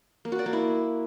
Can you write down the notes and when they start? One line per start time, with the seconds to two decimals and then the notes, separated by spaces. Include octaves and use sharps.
0.25 A#3
0.32 F#4
0.39 D5
0.46 A#3
0.53 E4